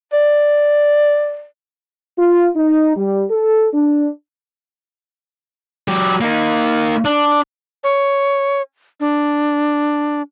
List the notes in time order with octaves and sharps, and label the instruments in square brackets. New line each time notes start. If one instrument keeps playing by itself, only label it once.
[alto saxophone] D5
[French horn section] F4
D#4
G3
A4
D4
[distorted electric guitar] F#3 G4
A#3 D#4
D4
[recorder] C#5
D4